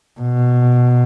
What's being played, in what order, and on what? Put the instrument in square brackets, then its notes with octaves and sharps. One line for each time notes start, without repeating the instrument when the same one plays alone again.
[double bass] B2